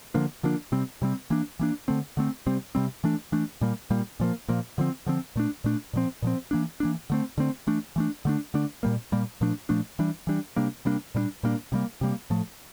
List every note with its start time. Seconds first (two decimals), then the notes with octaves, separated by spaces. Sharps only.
0.14 D3 F3 A#3 D4
0.43 D3 F3 A#3 D4
0.72 C3 G3 C4
1.02 C3 G3 C4
1.30 E3 A#3 D4
1.59 E3 A#3 D4
1.88 D3 A3 C4
2.17 D3 A3 C4
2.47 C3 G3 C4
2.75 C3 G3 C4
3.04 E3 A3 D4
3.32 E3 A3 D4
3.61 A#2 G3 A#3
3.90 A#2 G3 A#3
4.20 A#2 F3 A#3
4.49 A#2 F3 A#3
4.78 D3 F3 C4
5.06 D3 F3 C4
5.36 A#2 A3 D4
5.64 A#2 A3 D4
5.93 A#2 F3 C4
6.22 A#2 F3 C4
6.51 E3 A#3 D4
6.80 E3 A#3 D4
7.10 D3 A3 C4
7.38 D3 A3 C4
7.67 E3 A3 D4
7.96 E3 A3 D4
8.25 D3 A3 D4
8.54 D3 A3 D4
8.83 A#2 G3 A#3
9.12 A#2 G3 A#3
9.41 A#2 F3 A3 D4
9.69 A#2 F3 A3 D4
9.99 E3 G3 D4
10.27 E3 G3 D4
10.56 C3 G3 A#3 D4
10.85 C3 G3 A#3 D4
11.15 A#2 G3 A#3 D4
11.43 A#2 G3 A#3 D4
11.72 C3 G3 A#3
12.01 C3 G3 A#3
12.30 A2 F3 A3